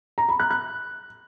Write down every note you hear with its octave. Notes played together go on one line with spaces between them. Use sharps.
A#5
B5
F#6
F#6